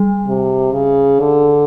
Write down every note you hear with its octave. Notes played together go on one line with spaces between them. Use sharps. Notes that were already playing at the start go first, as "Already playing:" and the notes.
Already playing: G3
C3
C#3
D3